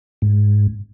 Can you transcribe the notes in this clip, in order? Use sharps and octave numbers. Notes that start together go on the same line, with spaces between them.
G#2